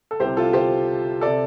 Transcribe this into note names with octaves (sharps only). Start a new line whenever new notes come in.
A4
C2 C3 G4 C5
F4 A4
G4 C5
C3 A4 D5